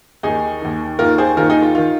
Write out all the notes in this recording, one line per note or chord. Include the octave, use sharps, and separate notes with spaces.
D#2 D#3 D#4 G#4
D#2 D#3
D#2 D#3 F4 A#4
G#4 C5
D#2 D#3 F4 A#4
D#4 G#4
F4
D#3 F4